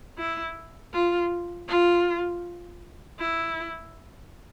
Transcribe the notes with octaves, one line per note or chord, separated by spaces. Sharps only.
E4
F4
F4
E4